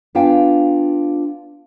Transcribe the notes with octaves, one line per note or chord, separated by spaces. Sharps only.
B3 D4 F4 F5 G5 G#5